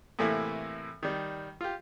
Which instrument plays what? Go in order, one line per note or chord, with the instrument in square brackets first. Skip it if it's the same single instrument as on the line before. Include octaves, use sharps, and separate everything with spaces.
[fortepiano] A2 C3 E3 A3 A#3 E4
D#3 G3
F4 G4